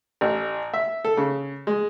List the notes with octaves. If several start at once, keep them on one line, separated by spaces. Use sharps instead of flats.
A1
E5
A4
C#3
G#3